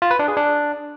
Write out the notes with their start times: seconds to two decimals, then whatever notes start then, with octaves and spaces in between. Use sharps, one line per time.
0.02 F4
0.11 B4
0.19 D4
0.28 G#4
0.37 D4